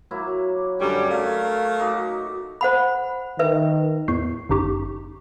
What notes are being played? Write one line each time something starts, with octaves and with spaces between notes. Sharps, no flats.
F#3 A#3 E4
F#2 D3 G3 G4 C#5
A3 A#4 F5
D#4 F#4 D6
C5 F#5 B5
D#3 B4 E5
E2 A2 C#6 G6 C7
G1 F#2 D#4 G4 C#6